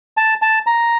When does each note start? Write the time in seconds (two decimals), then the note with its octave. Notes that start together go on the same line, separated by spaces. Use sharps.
0.17 A5
0.42 A5
0.67 A#5